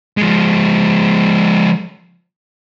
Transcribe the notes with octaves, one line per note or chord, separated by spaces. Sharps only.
F3 G#3